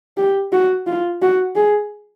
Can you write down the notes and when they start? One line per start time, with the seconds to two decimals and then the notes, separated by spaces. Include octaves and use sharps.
0.17 G4
0.53 F#4
0.87 F4
1.22 F#4
1.56 G#4